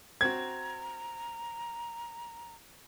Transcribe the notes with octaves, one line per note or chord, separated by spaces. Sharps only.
C4 F#4 A#5 G#6